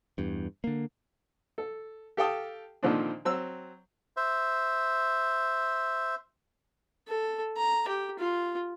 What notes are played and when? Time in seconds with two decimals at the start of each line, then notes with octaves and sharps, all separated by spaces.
0.18 E2 G2
0.64 D3 A#3
1.58 A4
2.17 G4 A4 F5 G5 A5 D#6
2.83 A#2 D3 D#3 F3 C4 D4
3.25 F#3 C4 E6
4.17 C5 E5
7.08 A4
7.57 A#5
7.88 G4
8.19 F4